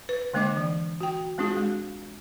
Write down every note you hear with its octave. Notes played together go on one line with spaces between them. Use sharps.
B4
D3 G#3 A#3 D4 D#5 D6
E3
F#4 G5
G#3 C4 D4 F4 F#4 G#4
G#3